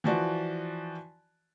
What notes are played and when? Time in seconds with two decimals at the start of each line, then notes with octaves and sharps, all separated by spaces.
0.04 E3 F3 F#4 D5